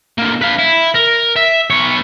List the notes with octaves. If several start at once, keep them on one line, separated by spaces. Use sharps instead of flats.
D3 A#3
B4 F5
E4
A#4
E5
B3 C#5